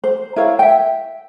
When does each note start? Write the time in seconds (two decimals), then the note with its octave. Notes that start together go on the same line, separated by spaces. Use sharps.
0.04 C5
0.36 E4 A#4 C#5 F5
0.59 E5 G5